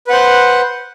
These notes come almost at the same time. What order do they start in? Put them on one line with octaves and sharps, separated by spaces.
B4 F#5 C5